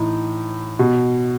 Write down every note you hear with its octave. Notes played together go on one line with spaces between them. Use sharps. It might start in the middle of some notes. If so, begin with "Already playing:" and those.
Already playing: A2 E3 D#4
B2